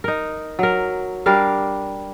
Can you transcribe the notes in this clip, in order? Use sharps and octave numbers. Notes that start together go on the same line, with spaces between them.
D#4 A#4
F#3 A#4
G3 D4 A#4 F5